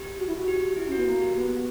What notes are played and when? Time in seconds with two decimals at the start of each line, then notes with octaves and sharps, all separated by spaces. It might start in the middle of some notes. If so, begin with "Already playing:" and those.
Already playing: G4
0.18 F#4
0.27 E4
0.36 F#4
0.48 G4
0.76 E4
0.86 C#4
0.92 B3 F#4
1.07 A#3 F#4
1.21 G4
1.36 B3